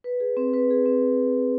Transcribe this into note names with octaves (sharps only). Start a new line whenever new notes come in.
B4
G#4
C4
B4
G#4
C4